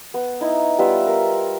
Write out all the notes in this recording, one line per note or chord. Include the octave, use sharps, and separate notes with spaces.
B3
D#4 E4
G3 B3 F4 E5
A#4